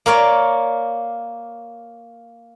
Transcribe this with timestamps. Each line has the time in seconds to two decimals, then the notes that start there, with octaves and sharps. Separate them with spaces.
0.06 A#3 A#4 C#5 D5